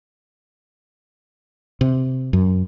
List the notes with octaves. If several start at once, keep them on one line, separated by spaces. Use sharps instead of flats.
C3
F#2